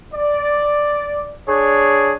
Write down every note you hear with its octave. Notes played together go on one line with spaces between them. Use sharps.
D5
D4 G#4 C#5